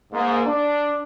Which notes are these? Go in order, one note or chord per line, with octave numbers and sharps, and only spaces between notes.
G#2 A#3
D4